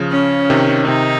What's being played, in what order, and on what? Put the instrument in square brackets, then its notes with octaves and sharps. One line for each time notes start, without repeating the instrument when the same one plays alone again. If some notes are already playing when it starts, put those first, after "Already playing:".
Already playing: [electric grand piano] C#3 F3
[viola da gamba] C#4
[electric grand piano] C3 D#3
[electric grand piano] C3 [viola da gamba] D#4